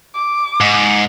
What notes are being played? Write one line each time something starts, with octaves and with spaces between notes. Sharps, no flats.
D6
G#2